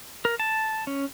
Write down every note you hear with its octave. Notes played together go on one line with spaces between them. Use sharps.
A#4
A5
C#4